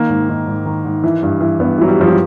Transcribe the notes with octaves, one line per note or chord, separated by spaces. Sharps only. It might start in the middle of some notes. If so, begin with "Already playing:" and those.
Already playing: D#3 A#3
G#2
D#3
G#2
D#3
G#2
E3
G2
E3
G2 B3
E3 F#3
G3
G2 F3
F#3